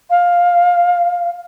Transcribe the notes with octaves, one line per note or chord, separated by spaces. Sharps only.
F5